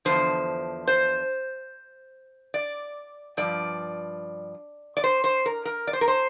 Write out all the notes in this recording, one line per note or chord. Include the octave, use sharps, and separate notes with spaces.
E2 D3 F3 C5
C5
D5
G2 F3 D5
D5
C5
C5
A#4
A#4
D5
C5
A#4
C5